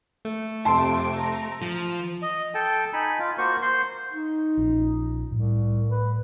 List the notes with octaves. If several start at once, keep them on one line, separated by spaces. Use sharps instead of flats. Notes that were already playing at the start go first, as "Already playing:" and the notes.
A3
F2 C3 A5 C6 D7
A#5
F3
D#5
A4 G5 A5
D#4 G#5 B5
F4
A#3 F#4 C5 C#6
C5 C6
D#4
A#1 F3 C#4
C2 A2
B4